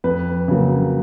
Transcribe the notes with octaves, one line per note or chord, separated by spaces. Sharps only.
F2 B4
C#3 F#3 A#3